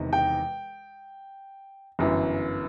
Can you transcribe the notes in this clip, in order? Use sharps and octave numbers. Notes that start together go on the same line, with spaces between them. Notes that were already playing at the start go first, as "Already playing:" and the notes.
Already playing: E1 E2 C3 D#3
G5
G1 F#2 E3